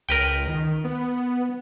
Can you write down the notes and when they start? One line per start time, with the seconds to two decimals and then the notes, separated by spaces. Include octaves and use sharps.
0.09 C#2 A#4 B4 G5
0.48 D#3
0.84 B3